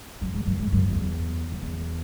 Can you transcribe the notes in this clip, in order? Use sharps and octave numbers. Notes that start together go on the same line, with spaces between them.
F#2
G#2
F#2
G#2
F#2
E2
F#2
E2